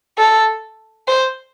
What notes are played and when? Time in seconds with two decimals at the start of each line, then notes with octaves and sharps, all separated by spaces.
0.18 A4
1.08 C5